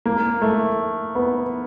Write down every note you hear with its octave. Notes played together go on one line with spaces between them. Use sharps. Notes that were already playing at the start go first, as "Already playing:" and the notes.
A#3
A3
B3